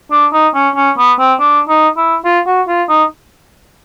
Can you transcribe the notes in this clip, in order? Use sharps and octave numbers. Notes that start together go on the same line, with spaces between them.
D4
D#4
C#4
C#4
B3
C4
D4
D#4
E4
F4
F#4
F4
D#4